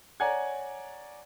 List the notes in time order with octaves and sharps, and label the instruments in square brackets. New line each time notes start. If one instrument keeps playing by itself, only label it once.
[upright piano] C#5 D5 F#5 G#5 A#5 G#6